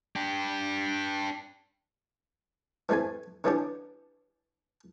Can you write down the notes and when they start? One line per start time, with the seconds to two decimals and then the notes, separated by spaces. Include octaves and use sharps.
0.16 D4 G4
2.89 E3 G3 A3 C4 G#5
3.44 D3 E3 G3 C#4 D4 G4